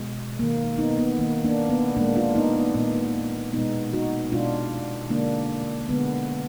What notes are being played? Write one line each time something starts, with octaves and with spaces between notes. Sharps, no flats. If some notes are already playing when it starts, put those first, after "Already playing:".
Already playing: B2 G#3
D#3 A#3
B3 D#4
B3
D#3 A#3
A#3 D4
B3
A#2 G#3 A#3 D4
D4 F4
B3 D#4
B3
A#2 G#3 B3
B2 G#3 B3 D#4
D#4 F#4
B2 G#3 D4 F4
D3 G#3 A#3 D4
D3 G#3 B3